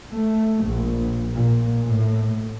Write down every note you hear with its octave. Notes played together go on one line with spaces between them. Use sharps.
A3
A#1
A#2
A2